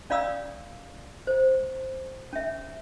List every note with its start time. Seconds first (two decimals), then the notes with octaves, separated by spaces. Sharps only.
0.10 C#4 D5 F5 B5 D#6 E6
1.27 C5
2.33 C#4 E5